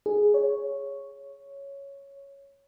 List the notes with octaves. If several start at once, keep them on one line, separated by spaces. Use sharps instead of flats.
G#4
C#5